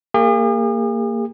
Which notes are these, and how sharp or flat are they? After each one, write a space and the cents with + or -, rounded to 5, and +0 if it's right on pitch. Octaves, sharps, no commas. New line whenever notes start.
A#3 -20 G#4 -45